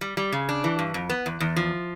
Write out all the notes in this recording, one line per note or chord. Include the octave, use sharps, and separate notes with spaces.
G3
G3
C#3
D4
E3
G2
F2
B3
E2
E2
F3